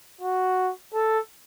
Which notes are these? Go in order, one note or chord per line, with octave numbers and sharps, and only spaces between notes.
F#4
A4